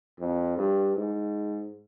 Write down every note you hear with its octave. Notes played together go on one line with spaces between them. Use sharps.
F2
G2
G#2